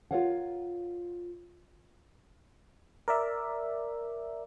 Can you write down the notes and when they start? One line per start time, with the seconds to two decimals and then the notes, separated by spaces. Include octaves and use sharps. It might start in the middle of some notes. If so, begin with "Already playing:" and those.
0.11 F4 A4 A#4 C#5 F5 F#5
3.08 A#4 D5 E5